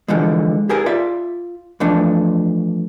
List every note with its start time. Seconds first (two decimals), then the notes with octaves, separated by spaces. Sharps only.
0.08 D3 E3 F3 G#3
0.69 G4 G#4 A#4
0.86 F4 D5 E5
1.80 E3 F3 A3 D4